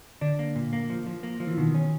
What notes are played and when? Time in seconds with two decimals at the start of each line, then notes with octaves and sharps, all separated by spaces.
0.21 D3 D4
0.39 A#3
0.56 A#2
0.73 A#3
0.90 F3
1.07 F3
1.23 A#3
1.40 F3
1.47 E3
1.58 B2 D#3
1.74 C#4